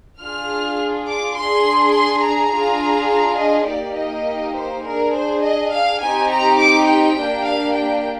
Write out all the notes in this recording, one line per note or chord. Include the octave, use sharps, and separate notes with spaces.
D4 F4 G#4 F6
D6
D4 G#4 C6
C6
A#5
D4 F4 G#4
A#5
D#5
A#3 D#4 G4 D5
D#5
C5
D4 G#4 A#4
C5
D#5
F5
C4 D#4 G4 G#5
A#5
D6
G5
A#3 D4 G4
F5
G5